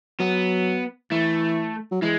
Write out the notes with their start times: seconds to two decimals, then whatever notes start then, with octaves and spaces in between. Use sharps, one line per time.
0.20 F#3 B3
1.11 E3 A3
1.91 F#3
2.02 E3 G#3